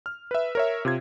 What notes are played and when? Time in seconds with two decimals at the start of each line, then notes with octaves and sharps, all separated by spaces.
0.06 F6
0.31 B4 E5
0.55 A#4 C#5 E5
0.85 C3 F4 G#6